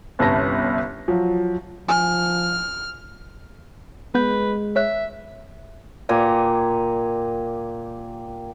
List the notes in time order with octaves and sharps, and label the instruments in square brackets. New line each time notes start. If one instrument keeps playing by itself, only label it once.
[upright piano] G1 C2 C#4 B4 A5 A#6
F3 F#3
[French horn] F3 [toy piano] G#5 [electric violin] F6
[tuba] G#3 [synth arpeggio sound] B3 G6 [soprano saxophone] B4
[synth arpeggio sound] C#5 F#6 [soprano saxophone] E5
[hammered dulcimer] A#2 G4 G#5 A#5